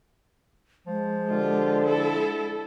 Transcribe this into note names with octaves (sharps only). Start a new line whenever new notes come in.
F3 G#3
D3 F4 G4
E4 A4